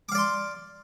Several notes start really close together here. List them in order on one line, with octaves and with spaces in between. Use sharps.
D6 F5 D5 C6